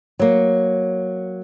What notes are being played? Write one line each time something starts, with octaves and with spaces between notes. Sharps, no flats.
F#3 A#3